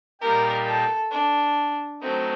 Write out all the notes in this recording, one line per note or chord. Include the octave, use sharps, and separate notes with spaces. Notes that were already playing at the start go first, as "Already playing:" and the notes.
A#2 G3 A#3 D#4 G4 A#4
A4
D4
F#3 A3 C4 D#4